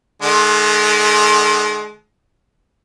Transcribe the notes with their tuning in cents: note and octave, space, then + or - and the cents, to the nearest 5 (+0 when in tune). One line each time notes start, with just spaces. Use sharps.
D#3 -45 G#3 +25 A5 -45